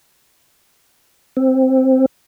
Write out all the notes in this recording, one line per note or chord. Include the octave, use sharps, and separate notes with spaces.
C4